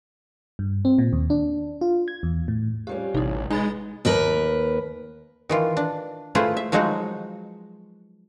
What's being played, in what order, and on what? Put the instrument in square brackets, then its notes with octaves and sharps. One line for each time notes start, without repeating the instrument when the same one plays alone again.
[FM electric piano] G2
C4
A#2
D#2
D4
F4
G#6
E2
A2
[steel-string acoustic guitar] F2 G3 C#4 [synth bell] G4
[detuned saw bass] A1 [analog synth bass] C3 [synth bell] D#4 E4
[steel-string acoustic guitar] B2 [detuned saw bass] G#3 [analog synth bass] D#4 [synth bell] G#5 B5 A6
[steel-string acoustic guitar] D#2 A#4 B4
[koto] D#3 E3 F4
D4
A3 E4 F4 G#4 B4 C5
E5
F3 F#3 G#3 D#4 F#4